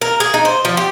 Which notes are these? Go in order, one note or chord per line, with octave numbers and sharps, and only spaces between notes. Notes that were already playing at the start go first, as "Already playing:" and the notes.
A#4
G#4
D#4
C5
F3
G4